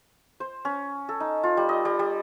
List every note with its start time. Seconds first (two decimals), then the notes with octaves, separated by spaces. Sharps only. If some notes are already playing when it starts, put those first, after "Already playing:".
0.40 C5
0.65 C#4
1.09 A4
1.20 D#4
1.43 F4
1.57 G3
1.69 D#5
1.85 G3
1.99 G3